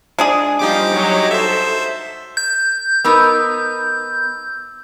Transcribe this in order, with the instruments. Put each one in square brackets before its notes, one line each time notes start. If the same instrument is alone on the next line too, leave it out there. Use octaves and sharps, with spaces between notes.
[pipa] G#3 D4 G#4
[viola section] F3 G3 [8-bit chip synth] D#4 G4 D6
[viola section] F#3 C#5 D#5
[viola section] A4 [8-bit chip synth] C5 E5
[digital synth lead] G6
[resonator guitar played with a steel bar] B3 D#4 A#4 [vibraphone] E6